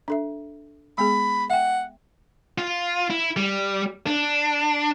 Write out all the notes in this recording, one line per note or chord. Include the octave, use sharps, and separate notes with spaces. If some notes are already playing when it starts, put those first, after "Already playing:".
D4 A4 E5
G#3 B3 G#4 B5
E5 F#5 G5
F4
E4
G3
D4